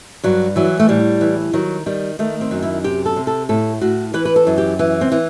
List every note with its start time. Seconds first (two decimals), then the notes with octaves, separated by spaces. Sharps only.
0.24 G2 F#3
0.56 E3 F#3
0.80 A3
0.89 A2 G3
1.21 E3
1.53 D#3 F#3
1.86 D#3 G3
2.19 D#3 A3
2.41 C4
2.51 F#2
2.63 E4
2.84 C3 G4
3.06 A4
3.16 C3
3.27 A4
3.49 A2 A4
3.81 A2 F#4
4.14 E3 B4
4.25 B4
4.36 A4
4.47 F#2
4.58 G4
4.79 E3
5.01 C4
5.12 E3